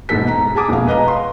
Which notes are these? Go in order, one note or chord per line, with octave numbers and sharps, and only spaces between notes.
E1 G#2 B3 A4 B6
A#5
G#4 G#5 A5 D6 D#6
E1 F2 F5
B4 D#5 F5 A#5
C6